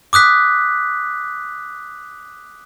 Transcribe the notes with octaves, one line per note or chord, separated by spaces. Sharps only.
D6 D#6 F#6 B6